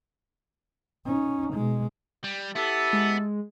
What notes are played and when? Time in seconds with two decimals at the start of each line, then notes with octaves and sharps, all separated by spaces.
1.06 C#4 D#4
1.54 B2 G#3
2.24 G3
2.55 B3 E4 G4 A4
2.93 G#3